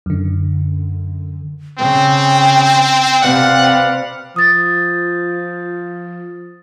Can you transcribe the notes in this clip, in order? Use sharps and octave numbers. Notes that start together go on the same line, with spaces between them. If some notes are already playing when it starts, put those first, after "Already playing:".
F#2 D3
C#3 C4 G5
C3 C4 B4 D5 F5 F#5
F3 D#6 A6